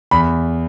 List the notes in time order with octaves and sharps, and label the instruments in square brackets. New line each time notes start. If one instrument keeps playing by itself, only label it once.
[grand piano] E2 B5